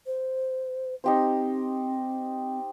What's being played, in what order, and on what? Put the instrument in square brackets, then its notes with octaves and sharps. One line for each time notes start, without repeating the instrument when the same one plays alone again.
[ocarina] C5
[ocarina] C4 [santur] D#4 G4 C5